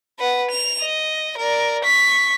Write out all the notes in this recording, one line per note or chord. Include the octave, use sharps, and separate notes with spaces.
B4 F#5
F7
D#5
A#4 D5
C#6 B6